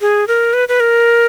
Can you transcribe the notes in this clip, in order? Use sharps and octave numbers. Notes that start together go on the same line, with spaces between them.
G#4
A#4
B4
B4
A#4